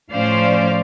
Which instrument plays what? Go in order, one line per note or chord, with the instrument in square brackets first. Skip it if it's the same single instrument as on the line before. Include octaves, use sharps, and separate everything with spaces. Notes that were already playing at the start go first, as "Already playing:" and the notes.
[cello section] A2 F3 C#4 C5 D5 F5